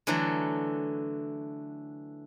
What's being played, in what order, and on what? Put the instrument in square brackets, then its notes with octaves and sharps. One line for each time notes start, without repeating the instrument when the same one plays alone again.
[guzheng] D3 E3 F#3 A3